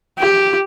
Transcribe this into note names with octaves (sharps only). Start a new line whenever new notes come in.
G4